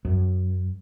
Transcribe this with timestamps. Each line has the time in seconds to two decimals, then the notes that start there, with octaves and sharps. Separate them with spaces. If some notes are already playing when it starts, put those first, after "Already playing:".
0.05 F#2